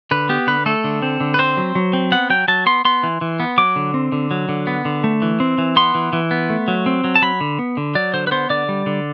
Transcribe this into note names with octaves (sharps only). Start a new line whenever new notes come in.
D3 B4
B3 G4
D3 B4
A3 A4
D3
C4
D3
B4
C4 C5
F#3
F#3
C4
B3 F#5
F#3 G5
F#3 A5
B3 C6
B3 C6
E3
E3
B3
F#3 D6
D3
C4
D3
F#3
D3
B3
D3
A3
E3
C4
E3
B3 C6
E3
E3
B3
A3
F#3
C4
F#3
A5
F#3 B5
D3
B3
D3
F#3 D5
D3 C5
B4
B3 C5
D3 D5
G3
D3